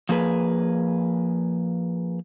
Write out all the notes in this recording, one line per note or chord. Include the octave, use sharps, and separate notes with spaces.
F3 A#3 G#4 B4